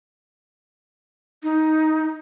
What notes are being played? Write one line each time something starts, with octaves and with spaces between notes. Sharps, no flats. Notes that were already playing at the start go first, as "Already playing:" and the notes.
D#4